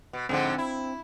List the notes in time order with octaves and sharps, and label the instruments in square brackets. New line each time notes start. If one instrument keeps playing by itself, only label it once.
[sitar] B2
[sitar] G#2 D3 F3 [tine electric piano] C4
[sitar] E4